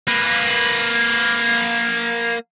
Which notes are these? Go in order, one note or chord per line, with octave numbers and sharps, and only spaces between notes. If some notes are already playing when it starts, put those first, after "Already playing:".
A#3 B4